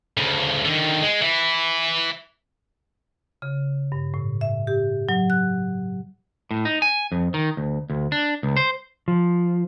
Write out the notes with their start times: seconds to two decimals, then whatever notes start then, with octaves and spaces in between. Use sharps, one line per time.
0.17 D2 C#3
0.65 D3 D#3
1.02 G#3
1.21 E3 E4
3.42 C#3
3.92 G2
4.14 A2
4.41 E5
4.67 G4
5.09 F#3
5.30 F#6
6.51 A2
6.65 D#4
6.82 G#5
7.12 F2
7.34 D#3
7.57 D2
7.90 D2
8.12 D4
8.43 C#2
8.57 C5
9.08 F3